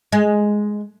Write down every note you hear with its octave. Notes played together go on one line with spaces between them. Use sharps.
G#3